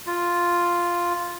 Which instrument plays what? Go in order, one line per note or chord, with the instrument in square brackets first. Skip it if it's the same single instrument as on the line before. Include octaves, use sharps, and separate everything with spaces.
[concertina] F4